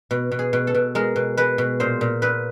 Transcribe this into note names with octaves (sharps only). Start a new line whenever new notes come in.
B2
B2
G#4
B2
A4
B2
G#3 A#4
B2
G#3 B4
B2
A#2 C5
A#2
A#2 B4